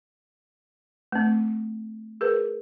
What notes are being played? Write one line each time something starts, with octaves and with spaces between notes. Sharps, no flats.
A3 C4
G#4 A#4 B4